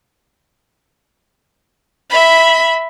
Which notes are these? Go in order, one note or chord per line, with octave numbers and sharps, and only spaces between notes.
E5 B5